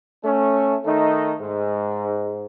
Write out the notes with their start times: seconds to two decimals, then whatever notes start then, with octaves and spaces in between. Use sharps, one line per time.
0.24 A3 C#4
0.84 D#3 A3 D#4
1.40 G#2